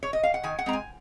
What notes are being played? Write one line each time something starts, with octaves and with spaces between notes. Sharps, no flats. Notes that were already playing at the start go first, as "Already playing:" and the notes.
C#5
D#5
F5
F#5
D#3 G#5
F#5
G#3 C4 A#5
G#5